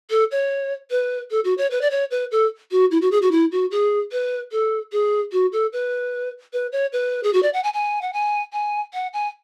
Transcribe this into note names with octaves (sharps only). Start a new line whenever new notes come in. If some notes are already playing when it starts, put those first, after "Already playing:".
A4
C#5
B4
A4
F#4
C#5
B4
D5
C#5
B4
A4
F#4
E4
F#4
G#4
F#4
E4
F#4
G#4
B4
A4
G#4
F#4
A4
B4
B4
C#5
B4
G#4
F#4
D5
F#5
G#5
G#5
F#5
G#5
G#5
F#5
G#5